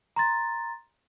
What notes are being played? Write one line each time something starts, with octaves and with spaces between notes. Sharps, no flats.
A#5 C6 A6